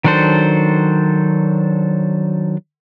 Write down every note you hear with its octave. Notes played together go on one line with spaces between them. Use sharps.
D#3 F#3 D4 A4 C5